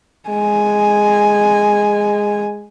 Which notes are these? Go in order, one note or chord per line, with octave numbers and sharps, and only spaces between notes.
G#3 G#5